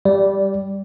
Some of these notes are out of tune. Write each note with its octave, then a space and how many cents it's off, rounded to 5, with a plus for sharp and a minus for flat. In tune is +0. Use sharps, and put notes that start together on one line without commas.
G3 +0 D5 -15